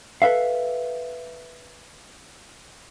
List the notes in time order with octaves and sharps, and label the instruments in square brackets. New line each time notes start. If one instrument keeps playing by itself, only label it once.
[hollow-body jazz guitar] A4 B4 E5 F5